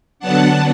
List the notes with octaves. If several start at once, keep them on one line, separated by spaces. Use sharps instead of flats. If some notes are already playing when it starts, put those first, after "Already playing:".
D3 F#3 B3 D4 F#5 A5